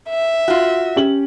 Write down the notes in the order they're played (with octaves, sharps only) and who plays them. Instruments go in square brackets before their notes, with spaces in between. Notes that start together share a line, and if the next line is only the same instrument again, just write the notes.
[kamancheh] E5
[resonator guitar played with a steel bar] F4 F#4
[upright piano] C#4 G4 F#7